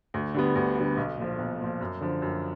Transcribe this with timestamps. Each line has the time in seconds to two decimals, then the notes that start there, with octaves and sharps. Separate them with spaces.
0.14 D2
0.34 D3 G3 B3
0.56 D2
0.76 D3 G3 B3
0.97 B1
1.18 A#2 F3
1.38 B1
1.60 A#2 F3
1.81 F#2
2.01 D3 F3
2.22 F#2